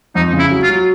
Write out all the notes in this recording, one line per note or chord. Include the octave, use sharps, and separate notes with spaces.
F2 D#4
C#3
E4
F#3
F4
F#3